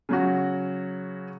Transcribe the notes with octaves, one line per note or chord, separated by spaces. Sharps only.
C#3 F#3 F#4